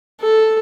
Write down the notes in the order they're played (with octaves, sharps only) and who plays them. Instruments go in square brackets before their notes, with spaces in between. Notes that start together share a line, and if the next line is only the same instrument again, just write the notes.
[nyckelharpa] A4